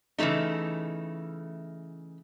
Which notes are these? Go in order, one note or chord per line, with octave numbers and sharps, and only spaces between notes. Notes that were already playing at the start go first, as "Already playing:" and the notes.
C#3 E3 F#3 A3 D#4